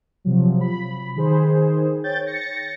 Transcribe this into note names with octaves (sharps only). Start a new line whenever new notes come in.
C3 F3 F#3
B5
D#3 G#4 C5
C#5 G5 G6 A6
A6 A#6 C#7